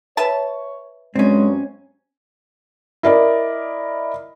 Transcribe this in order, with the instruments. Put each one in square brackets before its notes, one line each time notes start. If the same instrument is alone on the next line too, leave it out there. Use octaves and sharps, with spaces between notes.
[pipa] B4 E5 A5 [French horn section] C#5
[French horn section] G2 F#3 C#5 [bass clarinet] G#3 [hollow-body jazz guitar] C4 C#4
[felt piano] E4 A#4 D5 D#5